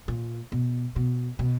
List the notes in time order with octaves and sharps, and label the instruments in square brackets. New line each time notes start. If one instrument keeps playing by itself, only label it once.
[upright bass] A#2
B2
B2
B2